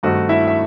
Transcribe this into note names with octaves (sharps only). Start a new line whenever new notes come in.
G2 D#3 A3 C4 D#4 F#4
E4 E5
E5